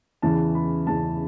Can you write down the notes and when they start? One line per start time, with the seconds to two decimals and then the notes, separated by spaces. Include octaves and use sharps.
0.22 E2 C#3 E3 A5
0.55 B5
0.87 E2 C#3 E3 A5